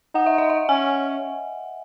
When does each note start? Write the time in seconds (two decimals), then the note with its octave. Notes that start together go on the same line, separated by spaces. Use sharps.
0.15 D#4 F#5
0.26 E5
0.38 D#5
0.50 E5
0.69 C#4 G#5